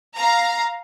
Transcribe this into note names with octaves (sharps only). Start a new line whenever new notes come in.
F5 A#5